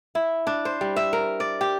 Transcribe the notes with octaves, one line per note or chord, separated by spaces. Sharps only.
E4
D4
C5
G3
E5
A#4
D5
G4